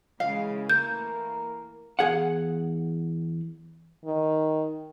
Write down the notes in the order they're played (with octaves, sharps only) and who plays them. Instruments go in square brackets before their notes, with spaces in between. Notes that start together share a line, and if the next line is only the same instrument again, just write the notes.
[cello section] C#3 E3 G#3 [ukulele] F5
[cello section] E3 A3 A#3 [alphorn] A#4 [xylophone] G6
[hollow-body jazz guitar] E2 G#4 F5 F#5
[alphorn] D#3